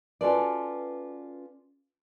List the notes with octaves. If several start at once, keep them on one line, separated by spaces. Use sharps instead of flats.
C#4 F4 F#4 A4 B4 D5